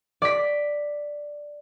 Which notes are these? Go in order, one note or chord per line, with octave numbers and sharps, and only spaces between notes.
D5 B6